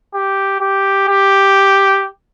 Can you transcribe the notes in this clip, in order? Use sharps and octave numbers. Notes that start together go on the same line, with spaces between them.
G4
G4
G4